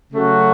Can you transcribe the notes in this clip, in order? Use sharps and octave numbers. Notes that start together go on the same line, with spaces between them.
C#3 F#3 A3 C#4 F#4